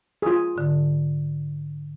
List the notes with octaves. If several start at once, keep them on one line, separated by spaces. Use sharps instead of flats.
F4 G#4
G#2 D3